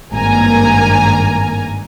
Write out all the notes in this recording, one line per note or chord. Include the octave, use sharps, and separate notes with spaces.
G#1 G2 A#3 G#5 A#5